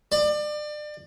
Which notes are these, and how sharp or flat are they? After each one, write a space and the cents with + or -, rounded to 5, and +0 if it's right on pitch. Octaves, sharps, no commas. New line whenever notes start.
D5 +30